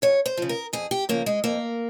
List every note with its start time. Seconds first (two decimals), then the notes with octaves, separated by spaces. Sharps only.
0.02 F2 C#5
0.26 C5
0.37 C#3 F3
0.49 A#4
0.73 F2 G#4
0.91 G4
1.09 C#3 F3 A#3
1.26 G#3
1.44 F2 A#3